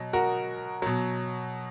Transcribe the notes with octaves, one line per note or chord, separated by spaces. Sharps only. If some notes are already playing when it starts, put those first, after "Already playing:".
Already playing: B2 F#3 D#5
F#4 A#4
B2 F#3